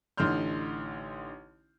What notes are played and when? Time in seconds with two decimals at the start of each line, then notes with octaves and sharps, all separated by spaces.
0.17 A1 D3 D#4 C6 F6 G6